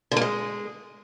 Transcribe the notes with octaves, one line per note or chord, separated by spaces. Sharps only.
D3
A#3
G#3